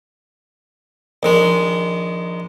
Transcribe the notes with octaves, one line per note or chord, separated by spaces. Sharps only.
A#1 D#3 G#3